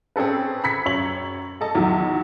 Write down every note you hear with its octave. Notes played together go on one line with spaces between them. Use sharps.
C4 C#4 G#4 A4 B4
B5 E6 G#6 B6 C#7
F#2 C#5 F#7
A4 D#5 A5
E2 D#3 F#3 E4 F4